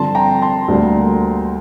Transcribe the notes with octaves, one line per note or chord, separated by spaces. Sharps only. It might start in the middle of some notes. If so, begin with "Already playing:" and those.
Already playing: G2 D3 F3 C4 A5 C6
G5 A#5
A5 C6
D2 D3 G3 A#3